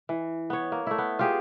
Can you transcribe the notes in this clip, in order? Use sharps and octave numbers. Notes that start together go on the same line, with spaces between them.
E3
B3 C#5
A#3
A3 E4
B3
F4 G4 G#4